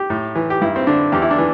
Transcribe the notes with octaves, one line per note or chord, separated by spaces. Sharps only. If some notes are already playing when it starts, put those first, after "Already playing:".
Already playing: G4
A2
E3
G4
G2 E4
C4
D3 D4
E2 G4
E4
D4
E3